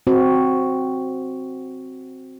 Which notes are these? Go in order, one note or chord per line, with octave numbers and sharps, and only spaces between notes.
C4 F#4